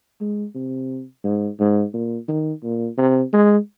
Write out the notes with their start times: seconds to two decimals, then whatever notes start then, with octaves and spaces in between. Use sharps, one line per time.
0.21 G#3
0.55 C3
1.24 G#2
1.60 G#2
1.93 A#2
2.28 D#3
2.63 A#2
2.98 C3
3.33 G#3